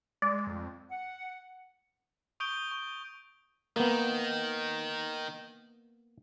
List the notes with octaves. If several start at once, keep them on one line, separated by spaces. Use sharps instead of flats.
G#3 D5
F2
F#5
C#6 D#6 G6 D7 G7
C#6 G7
D#3 A#3 B3